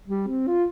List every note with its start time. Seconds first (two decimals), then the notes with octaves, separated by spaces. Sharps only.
0.08 G3
0.28 C4
0.47 F4